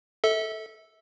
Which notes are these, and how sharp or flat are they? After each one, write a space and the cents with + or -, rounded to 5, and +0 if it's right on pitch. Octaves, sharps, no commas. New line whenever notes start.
A4 +0 E5 -30